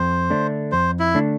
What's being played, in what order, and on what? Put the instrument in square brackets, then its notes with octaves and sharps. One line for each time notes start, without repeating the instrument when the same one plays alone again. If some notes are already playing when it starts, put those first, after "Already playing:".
Already playing: [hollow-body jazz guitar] F2 [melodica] C5
[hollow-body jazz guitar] D3 A3 D4
[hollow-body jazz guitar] F2 [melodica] C5
[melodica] E4
[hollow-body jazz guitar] D3 A3 D4